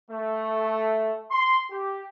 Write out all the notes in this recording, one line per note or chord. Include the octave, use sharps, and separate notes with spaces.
A3
C6
G4